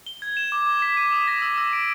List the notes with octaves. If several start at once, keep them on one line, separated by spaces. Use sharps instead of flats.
G7
G#6
E7
D6
D6
B6
D#7
D#6
A#6
E6
E6
D7